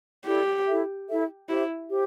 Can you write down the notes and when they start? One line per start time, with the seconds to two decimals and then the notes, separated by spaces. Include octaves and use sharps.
0.26 E4 G4 A4 D5
0.67 E4 A4 E5
1.08 E4 A4 E5
1.49 E4 G4 C5 E5
1.89 G4 C5